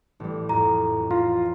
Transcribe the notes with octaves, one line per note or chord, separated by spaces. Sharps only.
A1 G3
F2 A2 A#5
F4 F5 A#5